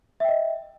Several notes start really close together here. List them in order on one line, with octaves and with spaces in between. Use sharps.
E5 G5 D#5